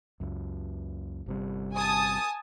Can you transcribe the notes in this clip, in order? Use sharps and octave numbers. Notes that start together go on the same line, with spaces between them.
C#2 F#2
G1 C3 G3
G#5 A5 D#6